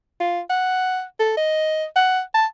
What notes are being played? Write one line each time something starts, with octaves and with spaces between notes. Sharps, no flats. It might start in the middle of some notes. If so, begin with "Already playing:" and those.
F4
F#5
A4
D#5
F#5
A5